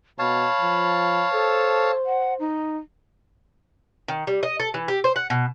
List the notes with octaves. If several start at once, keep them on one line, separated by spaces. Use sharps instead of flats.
B2 C#5 F5 A5 B5
F3
A4 C5
F#5
D#4
D#3
G3
D#5
A4
E3
G4
C5
F#5
B2